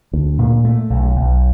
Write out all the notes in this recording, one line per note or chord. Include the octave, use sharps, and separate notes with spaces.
D2
A#2
A3
B1
B1